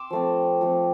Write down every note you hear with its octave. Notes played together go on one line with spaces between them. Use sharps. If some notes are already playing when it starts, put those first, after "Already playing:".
Already playing: C6 D6 E6
F3 A3 C4
F3 A3 C4